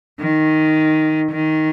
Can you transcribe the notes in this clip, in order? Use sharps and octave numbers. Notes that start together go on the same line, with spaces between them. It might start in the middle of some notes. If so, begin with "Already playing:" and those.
D#3
D#3